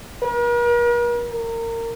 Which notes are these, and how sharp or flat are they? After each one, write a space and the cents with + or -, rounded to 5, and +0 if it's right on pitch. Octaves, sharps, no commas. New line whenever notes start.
A#4 +45
A#4 -25